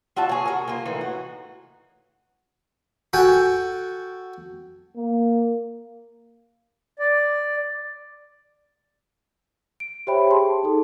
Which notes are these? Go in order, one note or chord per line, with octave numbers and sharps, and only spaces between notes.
F4 F#4 E5 A5
G#4 C#5
F#4 A4 A#4
A#3 F4
A2 E3 D#4
F#4
F#4 A4 G5 G#5
A#3
D5
D7
G4 C5 C#5 E5 G5 B5
G4 G#4 A5 C6
D#4 G#4 A4